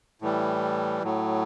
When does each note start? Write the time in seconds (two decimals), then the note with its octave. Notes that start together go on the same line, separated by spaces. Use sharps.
0.22 A2 E3 G3
1.03 A2 F#3